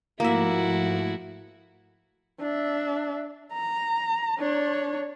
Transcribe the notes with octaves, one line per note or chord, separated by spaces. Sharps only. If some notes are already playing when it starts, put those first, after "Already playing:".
G#2 F3 A3 A#3 E4 F#4 E5
D4 E5
A#5
D4 C#5